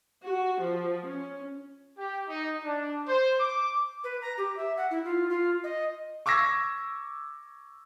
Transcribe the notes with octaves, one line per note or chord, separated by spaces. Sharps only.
F#4
F3
C#4
G4
D#4
D4
C5
D6
B4
A#5
G4
E5
F#5
E4
F4
F4
D#5
C#6 D6 E6 G#6 A#6